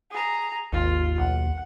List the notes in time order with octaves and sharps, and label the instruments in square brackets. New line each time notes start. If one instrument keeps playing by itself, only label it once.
[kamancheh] G#4 A#5
[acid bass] G#1 [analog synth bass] D#2 [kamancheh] F4
[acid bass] B1 [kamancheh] F#5